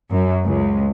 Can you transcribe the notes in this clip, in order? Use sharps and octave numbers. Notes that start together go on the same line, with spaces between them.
F#2
C#2